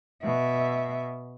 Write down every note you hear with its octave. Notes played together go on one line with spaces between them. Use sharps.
B2 E5